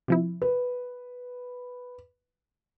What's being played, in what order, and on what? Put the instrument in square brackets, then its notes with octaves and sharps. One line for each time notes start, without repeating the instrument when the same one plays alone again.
[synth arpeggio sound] C3 F3 E4
[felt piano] B4